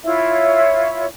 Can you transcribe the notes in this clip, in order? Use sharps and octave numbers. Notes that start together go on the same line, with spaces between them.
E4 F4 C#5 E5